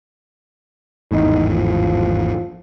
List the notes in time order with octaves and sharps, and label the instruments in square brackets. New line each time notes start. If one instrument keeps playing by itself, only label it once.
[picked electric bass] G#1 E2 A2 [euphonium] D#4
[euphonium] F3